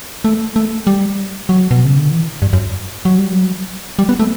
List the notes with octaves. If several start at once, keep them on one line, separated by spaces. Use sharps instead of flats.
A3
A3
G3
F#3
B2
C#3
D3
E3
G2
F#2
F#3
G3
F#3
G3
B3
A3